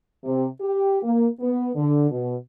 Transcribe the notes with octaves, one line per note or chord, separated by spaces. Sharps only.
C3
G4
A#3
B3
D3
B2